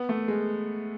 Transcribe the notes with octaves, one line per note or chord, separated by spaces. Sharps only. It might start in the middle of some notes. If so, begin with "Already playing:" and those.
Already playing: B3
A3
G#3